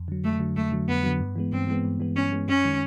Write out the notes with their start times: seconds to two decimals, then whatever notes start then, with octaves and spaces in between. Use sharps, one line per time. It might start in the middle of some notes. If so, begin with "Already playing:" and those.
Already playing: F2
0.08 D3 F#3
0.24 F2 A3
0.40 D3 F#3
0.56 F2 A3
0.72 D3 F#3
0.88 F2 B3
1.03 D3 F#3
1.20 G2
1.36 E3 G#3 B3
1.52 G2 C4
1.67 E3 G#3 B3
1.85 G2
2.00 E3 G#3 B3
2.16 G2 C#4
2.31 E3 G#3 B3
2.48 F#2 C#4
2.64 D#3 G#3